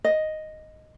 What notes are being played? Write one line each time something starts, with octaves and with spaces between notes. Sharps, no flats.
D#5